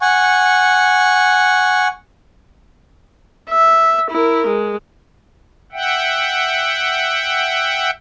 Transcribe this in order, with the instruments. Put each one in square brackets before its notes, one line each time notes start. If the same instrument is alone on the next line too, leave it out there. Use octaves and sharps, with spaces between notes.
[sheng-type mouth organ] F#5 G#5 C#6
[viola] E5
E4 A#4
G#3
[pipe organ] E5 F#5 G5